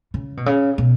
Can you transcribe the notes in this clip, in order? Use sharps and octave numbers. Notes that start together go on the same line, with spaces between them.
C#3
B2
C#3
B2